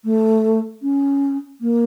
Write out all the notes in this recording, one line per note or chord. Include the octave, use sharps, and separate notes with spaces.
A3
C#4
A#3